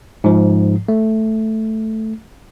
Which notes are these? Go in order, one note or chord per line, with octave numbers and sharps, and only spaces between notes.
G#2 F3
A3